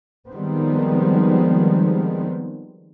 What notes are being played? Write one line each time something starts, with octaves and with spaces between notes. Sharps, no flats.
D#3 F3 G3 G#3 B3 C4